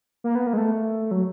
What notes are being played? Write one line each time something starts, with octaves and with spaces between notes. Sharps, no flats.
A#3
B3
A#3
G#3
A3
F#3